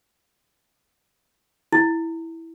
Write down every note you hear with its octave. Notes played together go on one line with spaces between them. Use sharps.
E4